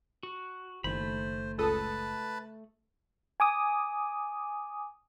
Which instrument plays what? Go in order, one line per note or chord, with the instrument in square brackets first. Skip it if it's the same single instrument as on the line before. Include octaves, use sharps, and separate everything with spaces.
[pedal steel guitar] F#4
[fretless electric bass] F#1 D#3 [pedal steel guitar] A3 B5 [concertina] C5
[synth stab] C#2 A4 D#6 [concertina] B4 A5
[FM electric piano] G#5 D6 D#6